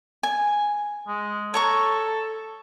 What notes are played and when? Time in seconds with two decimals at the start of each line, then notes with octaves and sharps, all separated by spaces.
0.23 G#5
1.08 G#3
1.54 A4 C#5 A#5 C#6